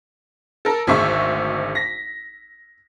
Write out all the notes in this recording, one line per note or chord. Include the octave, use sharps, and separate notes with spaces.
A4 A#4
G#1 D2 G#3 E5 C#6
A#6 B6